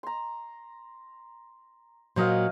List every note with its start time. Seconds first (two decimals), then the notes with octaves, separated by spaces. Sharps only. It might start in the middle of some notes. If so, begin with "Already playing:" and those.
0.03 A#5 C6
2.16 A#2 F#3 A#3 C5 D#5 F5